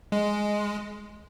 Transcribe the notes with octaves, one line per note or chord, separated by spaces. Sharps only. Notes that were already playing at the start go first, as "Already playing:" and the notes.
G#3